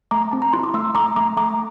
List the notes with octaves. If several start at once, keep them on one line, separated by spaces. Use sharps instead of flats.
A3 A#5 D6
C4 A5
A#5
E4 C6
D6
A3 C6 E6
A3 A#5 D6
A3 A#5 D6
A3 A#5 D6